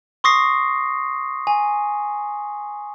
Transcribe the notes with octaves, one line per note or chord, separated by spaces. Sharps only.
C6 C#6 D#6 A#6 C7
G#5